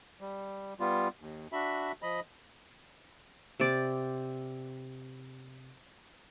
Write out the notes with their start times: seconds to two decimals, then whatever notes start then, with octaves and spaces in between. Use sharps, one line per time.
0.20 G3
0.80 G3 B3 F4
1.20 D#2
1.52 D4 F#4 E5 B5
2.02 F3 D#5 B5
3.60 C3 D5